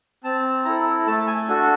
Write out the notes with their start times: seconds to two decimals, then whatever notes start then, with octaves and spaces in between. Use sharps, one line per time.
0.24 C4 A5
0.65 E4 A4 A#5
1.07 A3 A5
1.27 G#5
1.48 D4 F#4 A4